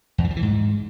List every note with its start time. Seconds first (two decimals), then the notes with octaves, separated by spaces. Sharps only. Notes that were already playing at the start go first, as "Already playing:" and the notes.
0.18 E2
0.24 E3
0.30 F3
0.36 E3
0.43 G#2